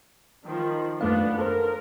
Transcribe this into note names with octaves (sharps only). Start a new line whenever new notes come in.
D#3 F3
F#2 A3 B3 D4 F5
A4 A#4 C5